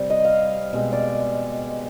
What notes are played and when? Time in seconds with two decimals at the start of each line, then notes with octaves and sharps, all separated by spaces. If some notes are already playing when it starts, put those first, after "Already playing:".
Already playing: C3 G3 C4
0.10 D#5
0.25 F5
0.73 B2 G#3 C4
0.93 D5